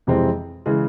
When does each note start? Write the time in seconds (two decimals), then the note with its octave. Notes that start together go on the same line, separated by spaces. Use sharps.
0.07 F2 C3 E3 G#3 C4
0.66 C#3 E3 G#3